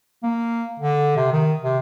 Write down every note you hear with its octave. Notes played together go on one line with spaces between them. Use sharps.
A#3
D3
C3
D#3
C3